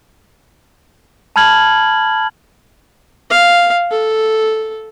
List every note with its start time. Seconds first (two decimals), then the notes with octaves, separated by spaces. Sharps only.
1.36 A5 B5 F6 G#6 F#7
3.30 F5
3.91 A4